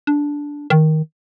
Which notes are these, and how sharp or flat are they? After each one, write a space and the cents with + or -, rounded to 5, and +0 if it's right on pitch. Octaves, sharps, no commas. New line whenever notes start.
D4 -10
D#3 +10